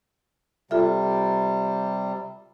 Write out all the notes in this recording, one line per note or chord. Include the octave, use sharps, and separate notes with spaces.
C3 G3 F4 A4 E5